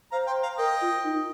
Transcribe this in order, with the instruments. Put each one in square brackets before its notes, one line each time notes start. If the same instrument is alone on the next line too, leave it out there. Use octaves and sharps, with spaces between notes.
[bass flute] C5 [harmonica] F5 A#5
[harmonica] G5 C6
F5 A#5
[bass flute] A#4 [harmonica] D#5 G5
[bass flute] F4
D#4